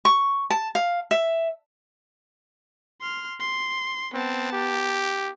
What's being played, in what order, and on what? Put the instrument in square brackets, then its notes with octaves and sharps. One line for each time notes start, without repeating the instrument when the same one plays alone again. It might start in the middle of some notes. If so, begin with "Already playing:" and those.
[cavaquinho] C#6
A5
F5
E5
[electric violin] C6 F6
C6
[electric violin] B3 A5 [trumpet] C4
[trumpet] G4